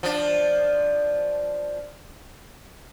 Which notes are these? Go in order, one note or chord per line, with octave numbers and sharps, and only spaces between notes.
F3 D4